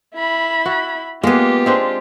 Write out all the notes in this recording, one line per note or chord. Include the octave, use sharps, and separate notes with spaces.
E4 B5
F#4
G#3 A#3 B3 F4 G4 G#4
G#3 C4 D4